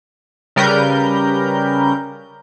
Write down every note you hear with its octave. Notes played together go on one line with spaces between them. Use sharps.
C#3 G3 A#4 B4 G6